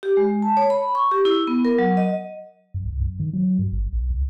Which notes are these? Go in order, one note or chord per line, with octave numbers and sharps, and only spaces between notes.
G4
G#3
A5
C#5
B5
C#6
G4
E4
B3
A#4
F#3
D#5
F#2
C2
F#2
D#3
F#3
G2
G#1
B1
C#2